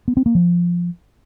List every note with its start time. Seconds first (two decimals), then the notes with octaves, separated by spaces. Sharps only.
0.08 B3
0.17 C4
0.26 A#3
0.35 F3